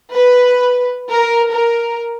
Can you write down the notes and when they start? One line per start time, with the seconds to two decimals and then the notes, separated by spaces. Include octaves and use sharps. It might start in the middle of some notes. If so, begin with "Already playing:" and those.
0.15 B4
1.11 A#4
1.53 A#4